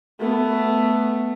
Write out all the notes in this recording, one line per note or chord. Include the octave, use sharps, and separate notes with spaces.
A3 B3